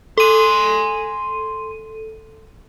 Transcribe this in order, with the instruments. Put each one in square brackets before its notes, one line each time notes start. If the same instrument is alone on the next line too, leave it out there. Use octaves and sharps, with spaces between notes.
[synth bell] A4 D#7 [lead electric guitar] G#5 C6